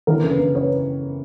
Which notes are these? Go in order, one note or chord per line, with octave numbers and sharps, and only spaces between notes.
E3 A#4
C#3
B4
C#3
B4 C#5